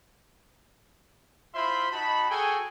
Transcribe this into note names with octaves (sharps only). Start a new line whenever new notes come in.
E4 F4 C5 E5 B5 C6
D#4 F#4 A5 B5
F#4 G#4 A4 G5 G#5